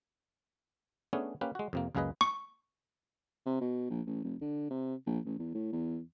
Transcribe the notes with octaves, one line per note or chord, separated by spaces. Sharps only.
A3 B3 C#4 D4 G#4
A#3 C#4 G4 B4
G#3 F#4
F2 C3 A#3
C#2 F#2 A#3 G#4 B4 D#5
C#6
C3
B2
A#1
A1
F1
D3
C3
A#1
A1
E2
A2
E2